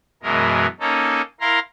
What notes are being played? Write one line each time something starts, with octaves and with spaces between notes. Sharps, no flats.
F#2 B2 E3 G#3 A#4
A#3 C#4 D#4 A4
E4 A#4 F5 A#5 C6